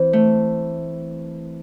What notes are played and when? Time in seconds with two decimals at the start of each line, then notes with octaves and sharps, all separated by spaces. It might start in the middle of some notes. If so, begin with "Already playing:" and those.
Already playing: E3 C4
0.13 A3